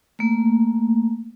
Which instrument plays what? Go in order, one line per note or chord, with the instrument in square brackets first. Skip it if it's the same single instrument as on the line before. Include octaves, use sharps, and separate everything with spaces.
[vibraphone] A3 A#3